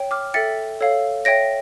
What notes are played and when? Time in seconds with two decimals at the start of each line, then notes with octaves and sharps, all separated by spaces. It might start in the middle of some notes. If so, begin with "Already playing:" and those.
Already playing: C#5 G5
0.11 D6 F6
0.34 A4 E5 G5 A6 C#7
0.81 A4 C#5 F5
1.25 C#5 E5 G5 A#6 D7